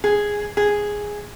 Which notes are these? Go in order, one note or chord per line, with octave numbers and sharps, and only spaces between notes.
G#4
G#4